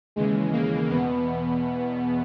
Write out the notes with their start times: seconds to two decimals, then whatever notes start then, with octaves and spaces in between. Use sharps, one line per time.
0.16 D#2 C#3 E3 G#3
0.53 A#3
0.90 E2 B2 B3